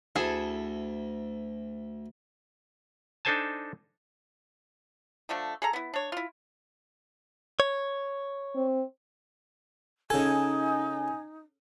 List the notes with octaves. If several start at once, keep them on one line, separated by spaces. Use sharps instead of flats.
D2 E4 G#4 A4
D4 D#4 A4 C5 G#5 A5
D3 F3 A3 D4
G#4 A4 A#5
B3 E4
D4 C#5
E4 F4
C#5
C4
C#3 D#4 A4 G#5